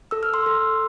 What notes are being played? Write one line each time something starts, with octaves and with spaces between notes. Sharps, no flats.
A4 E6
F6
C6 E6
A4